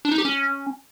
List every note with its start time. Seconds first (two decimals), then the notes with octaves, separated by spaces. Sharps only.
0.05 D4
0.11 D#4
0.18 G4
0.25 C#4